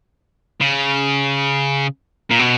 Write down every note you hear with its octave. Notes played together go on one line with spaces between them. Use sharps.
C#3
A#2
B2